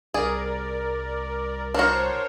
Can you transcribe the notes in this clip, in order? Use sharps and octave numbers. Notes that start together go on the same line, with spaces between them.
C2 G#4 A#4 D5
D4 F#4 A#4 C5 C#5